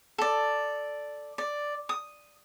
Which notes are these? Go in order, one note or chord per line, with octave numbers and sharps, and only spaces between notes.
A4 D5
D5
D#6